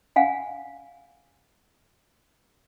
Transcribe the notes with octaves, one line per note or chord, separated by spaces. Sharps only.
F5 F#5 G#5